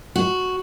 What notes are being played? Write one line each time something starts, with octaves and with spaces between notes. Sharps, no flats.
F#4